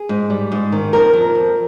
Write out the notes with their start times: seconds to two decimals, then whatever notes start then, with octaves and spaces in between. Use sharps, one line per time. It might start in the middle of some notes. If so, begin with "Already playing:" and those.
Already playing: G#4
0.09 G#2
0.30 G3
0.52 G#2
0.72 D#3
0.93 F2 A#4
1.13 F2
1.35 F2